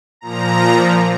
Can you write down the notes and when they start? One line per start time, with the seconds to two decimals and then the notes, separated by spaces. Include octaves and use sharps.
0.21 A#2 F3 A#5